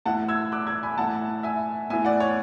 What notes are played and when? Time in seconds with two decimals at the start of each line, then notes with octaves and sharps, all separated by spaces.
0.06 A2 E3 F#5 A5
0.28 E6 G#6
0.52 D6 F#6
0.67 E6 G#6
0.83 G#5 B5
0.98 A2 E3 F#5 A5
1.43 E5 G#5
1.90 A2 E5 G#5
1.93 E3
2.05 D5 F#5
2.20 C#5